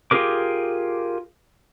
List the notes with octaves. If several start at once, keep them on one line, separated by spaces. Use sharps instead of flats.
F4 G4 G#4 A#4 D6